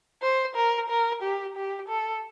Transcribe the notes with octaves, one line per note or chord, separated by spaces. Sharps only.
C5
A#4
A#4
G4
G4
A4